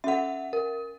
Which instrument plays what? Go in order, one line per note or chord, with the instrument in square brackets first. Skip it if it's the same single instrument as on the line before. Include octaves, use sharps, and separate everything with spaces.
[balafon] C#4 A4 [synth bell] E5 F#5
[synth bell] A#4